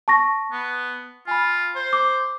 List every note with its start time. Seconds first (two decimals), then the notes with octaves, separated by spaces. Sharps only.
0.08 A5 C#6 A#6
0.52 B3
1.27 F4 G#5 B5
1.76 C5
1.93 D6